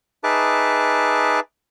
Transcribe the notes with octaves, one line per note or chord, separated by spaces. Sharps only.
D#4 G#4 B4 E5 A5 D6